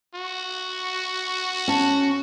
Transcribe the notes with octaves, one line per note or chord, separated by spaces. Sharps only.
F#4
C#4 A5